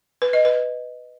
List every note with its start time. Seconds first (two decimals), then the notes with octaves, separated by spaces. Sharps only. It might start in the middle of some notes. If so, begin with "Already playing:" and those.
0.22 B4
0.33 D#5
0.45 B4